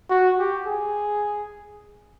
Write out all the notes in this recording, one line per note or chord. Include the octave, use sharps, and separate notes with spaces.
F#4
G4
G#4